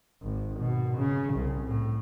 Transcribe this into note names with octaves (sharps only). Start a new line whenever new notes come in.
G#1
B2
C#3
C2
A2